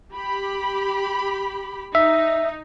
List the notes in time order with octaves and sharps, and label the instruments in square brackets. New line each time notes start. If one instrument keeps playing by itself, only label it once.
[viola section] G4 B5
[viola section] D#4 [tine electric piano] E5